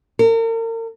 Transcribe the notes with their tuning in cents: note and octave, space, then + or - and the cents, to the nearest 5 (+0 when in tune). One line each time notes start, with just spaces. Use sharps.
A#4 -40